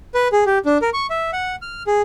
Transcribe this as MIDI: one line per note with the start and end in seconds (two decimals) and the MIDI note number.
0.14 0.28 71
0.32 0.44 68
0.46 0.58 67
0.65 0.78 62
0.82 0.90 70
0.93 1.07 85
1.10 1.31 76
1.33 1.56 78
1.62 1.83 89
1.87 2.02 68